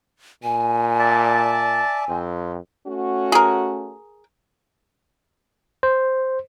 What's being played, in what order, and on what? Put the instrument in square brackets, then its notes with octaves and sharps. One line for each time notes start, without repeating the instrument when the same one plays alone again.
[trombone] A#2 [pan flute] G#5
[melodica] D5 E5 A5
[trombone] F2 [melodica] C4
[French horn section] A3 C#4 F#4
[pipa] G#4 A#4
[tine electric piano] C5